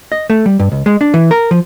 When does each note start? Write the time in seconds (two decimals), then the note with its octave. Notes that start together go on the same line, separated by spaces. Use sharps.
0.12 D#5
0.30 A3
0.46 G3
0.60 G2
0.72 C#2
0.86 G#3
1.01 D4
1.14 E3
1.31 A#4
1.51 F3